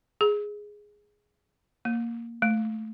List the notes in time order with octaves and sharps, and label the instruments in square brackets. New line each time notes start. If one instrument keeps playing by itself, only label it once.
[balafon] G#4
A#3
A3